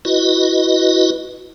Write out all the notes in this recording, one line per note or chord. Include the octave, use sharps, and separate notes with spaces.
E4 F#4 B4 D#5